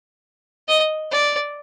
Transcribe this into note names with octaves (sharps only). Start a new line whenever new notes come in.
D#5
D5